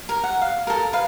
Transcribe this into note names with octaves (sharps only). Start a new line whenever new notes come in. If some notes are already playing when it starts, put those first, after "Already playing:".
A#4
F#5
F5
A4 A#4
B4 F5